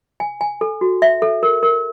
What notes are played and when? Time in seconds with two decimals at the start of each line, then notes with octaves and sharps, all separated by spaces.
0.20 G#5
0.41 G#5
0.61 A4
0.81 F#4
1.02 E5
1.22 A4
1.43 A#4
1.63 A#4